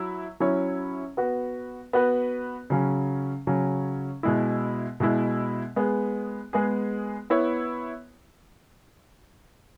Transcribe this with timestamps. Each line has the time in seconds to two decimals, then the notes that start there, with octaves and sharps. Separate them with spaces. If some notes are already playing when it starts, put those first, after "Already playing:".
Already playing: F#3 E4
0.40 F#3 C#4 E4 C#5
1.17 B3 F#4 B4
1.93 B3 F#4 B4
2.70 C#3 F#3 C#4
3.47 C#3 F#3 C#4
4.23 B2 G#3 E4
5.00 B2 G#3 E4
5.76 G#3 B3 G#4
6.53 G#3 B3 G#4
7.30 B3 E4 C#5